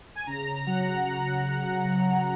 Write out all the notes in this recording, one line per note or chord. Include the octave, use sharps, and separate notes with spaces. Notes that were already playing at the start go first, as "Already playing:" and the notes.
G#5
C#3 A#5
F#3 F#5
F#3
C#3
C#3